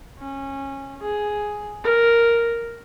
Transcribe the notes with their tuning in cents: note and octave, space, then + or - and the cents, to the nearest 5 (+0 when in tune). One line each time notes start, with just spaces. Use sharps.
C#4 -20
G#4 +5
A#4 +0